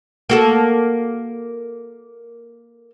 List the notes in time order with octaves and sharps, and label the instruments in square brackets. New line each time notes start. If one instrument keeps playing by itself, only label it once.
[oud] A#3 F#4 A4